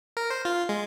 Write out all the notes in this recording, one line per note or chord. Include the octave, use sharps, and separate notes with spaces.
A#4
C5
F4
G#3